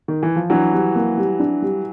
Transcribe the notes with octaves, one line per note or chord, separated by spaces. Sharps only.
D#3
E3
F3
E3 F#3 D4
G3
A#3
G3
D4
G3